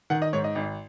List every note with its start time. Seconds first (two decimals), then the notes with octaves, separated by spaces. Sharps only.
0.10 D#3 F#5
0.22 D#5
0.33 G#2 C#5
0.44 D#5
0.55 G#1